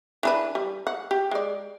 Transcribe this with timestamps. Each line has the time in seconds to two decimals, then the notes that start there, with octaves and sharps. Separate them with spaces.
0.23 E3 D4 B4
0.55 G3
0.87 F#5
1.11 G4
1.31 G#3 D5